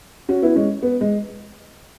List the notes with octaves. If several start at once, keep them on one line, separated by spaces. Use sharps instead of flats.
C#4 F#4
B3 E4
G#3 C#4
B3
G#3